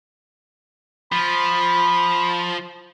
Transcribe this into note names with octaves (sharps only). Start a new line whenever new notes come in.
F3 B5